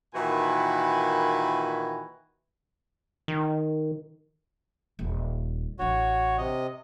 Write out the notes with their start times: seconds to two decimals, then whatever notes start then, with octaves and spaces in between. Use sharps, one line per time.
0.15 A#2 D#3 E3 F#4 B4 G#5
3.28 D#3
4.99 D#1
5.79 A1 D4 F#4 C#5
6.38 C3 D#5